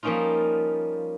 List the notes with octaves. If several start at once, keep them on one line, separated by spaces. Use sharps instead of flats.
F3 G3 A#3 C#4 D#4 F4